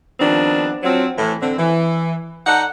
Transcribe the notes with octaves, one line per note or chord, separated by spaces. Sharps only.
D#3 F3 G3 B3 C4 D4
F3 F#3 C4
A2 E3
D3 C4
E3
D#4 A4 D5 F#5